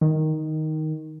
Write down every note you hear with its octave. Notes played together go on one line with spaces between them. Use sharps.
D#3